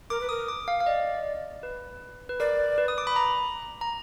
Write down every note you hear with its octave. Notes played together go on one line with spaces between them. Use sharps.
A#4 D6
B4
A#4 D#6
D6
F5
F5
D5 D#5
B4
B4
A#4 D5
B4
D#6
D6
B5
A#5
A#5